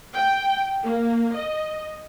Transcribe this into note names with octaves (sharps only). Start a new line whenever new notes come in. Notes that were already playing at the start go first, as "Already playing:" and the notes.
G5
A#3
D#5